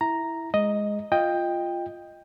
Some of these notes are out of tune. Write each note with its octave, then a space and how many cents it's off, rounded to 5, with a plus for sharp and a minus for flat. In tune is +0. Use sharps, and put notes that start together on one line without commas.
E4 +0 A#5 +0
G#3 +0 D#5 +0
F4 +0 D#5 +0 G5 +10